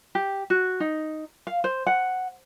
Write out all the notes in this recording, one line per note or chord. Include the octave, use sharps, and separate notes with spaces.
G4
F#4
D#4
F5
C5
F#5